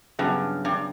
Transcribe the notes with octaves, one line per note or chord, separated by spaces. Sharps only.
G2 C#3 F#3 B3 E4 G#4
G2